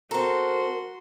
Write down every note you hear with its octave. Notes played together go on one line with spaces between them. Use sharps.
C4 F#4 A4 A#4 A#5 C6